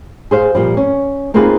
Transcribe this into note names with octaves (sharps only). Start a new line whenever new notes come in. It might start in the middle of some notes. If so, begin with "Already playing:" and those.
G#4 C5 F5
A#2 F3 G3
C#4
A#3 C4 D#4 F4 G#4 B4